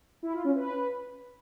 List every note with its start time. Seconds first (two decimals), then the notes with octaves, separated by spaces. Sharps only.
0.23 E4
0.34 F4
0.44 C#4
0.55 B4